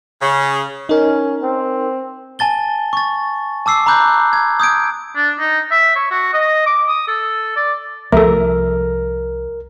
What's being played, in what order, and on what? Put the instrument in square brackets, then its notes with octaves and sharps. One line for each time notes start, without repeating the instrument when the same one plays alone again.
[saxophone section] C#3
[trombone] C#4 [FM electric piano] D#4 A#4
[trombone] C4
[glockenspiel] G#5 A5 A6 G7
C#6 A6
A5 D6 E6 C7
A#5 B5 D6 F#6 G6
G#6
D#6 G6 G#6 D7
[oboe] D4
D#4
E5
C#5
F#4
D#5
D6
D#6
A4
D5
[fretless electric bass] C2 F3 [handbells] A3 A4 [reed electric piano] A#4